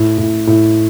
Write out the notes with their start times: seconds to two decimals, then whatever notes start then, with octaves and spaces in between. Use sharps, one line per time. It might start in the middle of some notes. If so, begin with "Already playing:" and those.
Already playing: A2
0.18 A2
0.47 A2